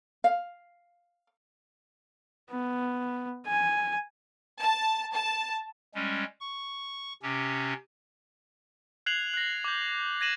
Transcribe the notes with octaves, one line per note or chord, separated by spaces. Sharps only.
F5
B3
G#5
A5
A5
G3 G#3 C#4
C#6
C3 C#4 G4
F#6 G#6 C7 F7 F#7
F#6 A#6
D6 G6
G#6 A#6 D#7 E7 F#7